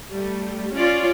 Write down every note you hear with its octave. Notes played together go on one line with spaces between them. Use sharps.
G3 A3
C#4 F4 D5